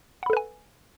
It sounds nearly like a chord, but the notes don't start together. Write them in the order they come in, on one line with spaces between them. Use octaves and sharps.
F#5 B5 A4 B4 G#5